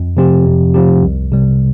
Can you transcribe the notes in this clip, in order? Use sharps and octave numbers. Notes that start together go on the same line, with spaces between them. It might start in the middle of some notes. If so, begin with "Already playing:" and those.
Already playing: F2
C3 F3 C4 G4
F2
C3 F3 C4 G4
C2
C3 G3